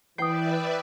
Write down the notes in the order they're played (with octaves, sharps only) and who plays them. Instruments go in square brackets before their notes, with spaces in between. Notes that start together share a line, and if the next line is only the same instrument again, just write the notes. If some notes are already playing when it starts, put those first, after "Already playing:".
[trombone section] E3 [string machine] B4 D5 E5 [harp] G5 [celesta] D#6 C7